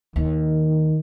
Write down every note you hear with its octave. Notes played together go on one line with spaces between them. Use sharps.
D#2 D#3